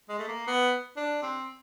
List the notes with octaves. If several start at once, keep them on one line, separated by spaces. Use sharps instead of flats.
G#3
A3
A#3
B3
D4
C4